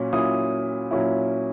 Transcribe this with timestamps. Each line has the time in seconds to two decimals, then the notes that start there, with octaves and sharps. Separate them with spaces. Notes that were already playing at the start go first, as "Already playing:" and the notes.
Already playing: A#2 F#3 C#4
0.13 A#2 F#3 C#4 E4 D#6
0.91 A#2 F#3 C#4 E4